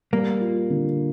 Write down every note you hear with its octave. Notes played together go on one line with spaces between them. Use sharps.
G3 A#3
F4
D3